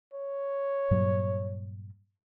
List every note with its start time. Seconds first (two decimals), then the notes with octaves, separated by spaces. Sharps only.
0.14 C#5
0.91 G2 A#2 F#3